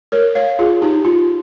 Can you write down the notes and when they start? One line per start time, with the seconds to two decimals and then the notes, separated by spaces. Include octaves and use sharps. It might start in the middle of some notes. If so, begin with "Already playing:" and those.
0.12 A#4 C#5
0.35 C#5 F5
0.59 F4 G#4
0.82 D#4 G4
1.05 F4